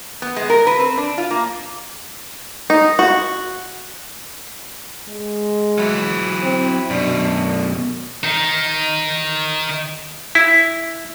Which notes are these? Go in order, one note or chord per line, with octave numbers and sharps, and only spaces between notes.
B3
G#3
A#4
B4
C4
D4
F4
A#3
D#4
F#4
G#3
F#3 E4
C4
F#2 B2 D4
D#3 D#4
E4